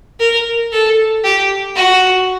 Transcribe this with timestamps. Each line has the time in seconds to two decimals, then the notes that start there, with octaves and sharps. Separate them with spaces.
0.20 A#4
0.72 A4
1.24 G4
1.76 F#4